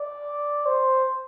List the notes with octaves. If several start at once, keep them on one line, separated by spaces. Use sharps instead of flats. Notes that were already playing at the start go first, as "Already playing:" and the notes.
Already playing: D5
C5